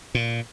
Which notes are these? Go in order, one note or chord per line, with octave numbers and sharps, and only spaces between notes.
A#2